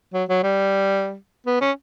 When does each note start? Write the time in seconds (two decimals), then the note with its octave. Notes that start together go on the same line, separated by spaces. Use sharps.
0.14 F#3
0.29 F#3
0.43 G3
1.47 B3
1.61 C#4